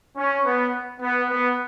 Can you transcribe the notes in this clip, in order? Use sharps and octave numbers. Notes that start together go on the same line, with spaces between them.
C#4
B3
B3
B3